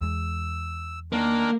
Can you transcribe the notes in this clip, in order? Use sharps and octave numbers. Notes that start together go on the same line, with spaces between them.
E2 G#3 E6
D#3 A#3 D4 A#4